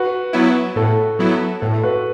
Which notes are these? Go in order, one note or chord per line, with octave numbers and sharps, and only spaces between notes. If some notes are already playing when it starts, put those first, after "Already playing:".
Already playing: F#4 B4
F#3 B3 E4
A2 A4
F#3 B3 E4
A2 A4
F#4 B4